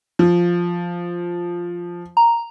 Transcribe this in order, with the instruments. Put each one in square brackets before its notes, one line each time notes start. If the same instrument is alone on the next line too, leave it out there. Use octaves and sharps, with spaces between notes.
[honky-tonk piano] F3
[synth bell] A#5